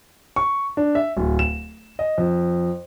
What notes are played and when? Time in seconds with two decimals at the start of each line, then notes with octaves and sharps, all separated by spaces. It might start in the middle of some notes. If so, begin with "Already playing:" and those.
0.36 C#6
0.77 D4
0.95 E5
1.17 D1
1.39 E7
1.99 D#5
2.18 F2